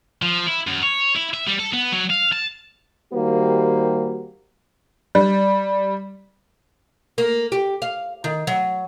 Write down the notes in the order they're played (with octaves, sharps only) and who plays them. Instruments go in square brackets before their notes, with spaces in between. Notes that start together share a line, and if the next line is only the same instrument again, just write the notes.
[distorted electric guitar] F3
E4
F#2
C#5
E4
E5
G3
A4
B3
F#3
F5
A5
[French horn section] D#3 G3 A#3 F#4 G4 C5
[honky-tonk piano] G3
[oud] A#3
G4
F5
D#3
F#3